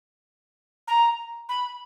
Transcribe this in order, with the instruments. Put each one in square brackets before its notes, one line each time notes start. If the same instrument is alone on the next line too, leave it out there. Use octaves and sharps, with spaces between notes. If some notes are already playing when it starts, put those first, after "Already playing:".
[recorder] A#5
B5